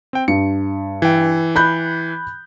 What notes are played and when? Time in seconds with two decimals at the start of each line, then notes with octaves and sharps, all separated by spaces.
0.13 C4 G5
0.28 G2 C#7
1.02 E3 G5
1.56 B5 F#6 G6